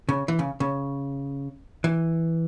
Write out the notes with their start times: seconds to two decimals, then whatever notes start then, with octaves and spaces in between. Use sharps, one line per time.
0.09 C#3
0.28 E3
0.39 C#3
0.60 C#3
1.84 E3